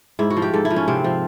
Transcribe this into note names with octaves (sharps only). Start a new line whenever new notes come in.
G#2 E4
F#4
F3
G4
G#2 A4
E4
F3
C#4
C3 C4
F3